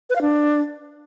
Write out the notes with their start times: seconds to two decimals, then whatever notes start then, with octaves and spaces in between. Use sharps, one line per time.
0.10 B4
0.16 F5
0.21 D4